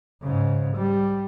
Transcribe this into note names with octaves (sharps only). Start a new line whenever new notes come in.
G#2 C#3
G3